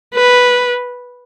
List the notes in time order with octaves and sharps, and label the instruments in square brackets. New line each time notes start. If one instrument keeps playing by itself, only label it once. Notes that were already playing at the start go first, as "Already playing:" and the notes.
[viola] B4